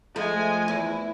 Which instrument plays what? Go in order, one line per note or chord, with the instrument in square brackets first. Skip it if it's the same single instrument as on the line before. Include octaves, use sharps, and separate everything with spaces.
[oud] F3 A3 [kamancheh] G#3 G#5
[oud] E2 [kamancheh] E4